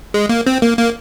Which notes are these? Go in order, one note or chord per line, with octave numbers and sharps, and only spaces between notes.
G#3
A#3
C4
A#3
A#3